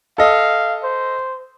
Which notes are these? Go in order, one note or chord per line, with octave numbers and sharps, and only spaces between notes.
A4 D#5 F5
C5